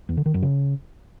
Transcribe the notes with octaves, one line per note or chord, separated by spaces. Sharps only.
E2
D3
D#3
F#2
C#3